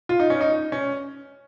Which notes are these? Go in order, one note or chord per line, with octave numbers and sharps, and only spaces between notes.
F4
D#4
C#4
D#4
C#4